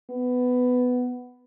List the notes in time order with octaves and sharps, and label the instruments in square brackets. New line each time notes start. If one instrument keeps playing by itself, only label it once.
[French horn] B3